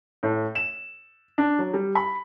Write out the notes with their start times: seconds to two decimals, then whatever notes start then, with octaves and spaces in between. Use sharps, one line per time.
0.23 A2
0.55 E7
1.38 D4
1.59 F#3
1.74 G3
1.95 B5